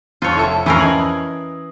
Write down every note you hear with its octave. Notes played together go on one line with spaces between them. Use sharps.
F2 F4 C#5
F1 E4 A4
F2 E3 C#4 A#4 E6 C7
D#5 G#6 F#7